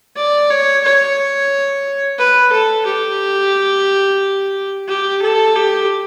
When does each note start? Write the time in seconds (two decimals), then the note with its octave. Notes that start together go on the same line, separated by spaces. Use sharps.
0.16 D5
0.49 C#5
0.83 C#5
2.18 B4
2.52 A4
2.86 G4
4.88 G4
5.22 A4
5.55 G4